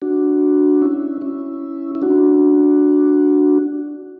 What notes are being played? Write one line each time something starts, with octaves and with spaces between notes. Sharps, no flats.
D4 F#4
C#4 E4
C#4 E4
E4
D4 F#4